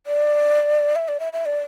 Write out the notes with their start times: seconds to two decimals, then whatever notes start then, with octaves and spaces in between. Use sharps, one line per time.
0.06 D5
0.95 E5
1.08 D5
1.20 E5
1.33 E5
1.45 D5